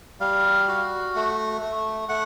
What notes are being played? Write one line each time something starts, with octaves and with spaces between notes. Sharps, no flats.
G3 F5
F#4
A3
A3
A3 F#5